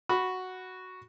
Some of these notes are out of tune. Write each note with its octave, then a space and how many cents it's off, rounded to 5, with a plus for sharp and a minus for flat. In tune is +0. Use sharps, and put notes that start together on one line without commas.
F#4 +0 B5 +0